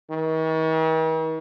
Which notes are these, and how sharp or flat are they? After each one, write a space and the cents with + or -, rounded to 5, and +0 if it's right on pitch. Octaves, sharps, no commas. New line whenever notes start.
D#3 +45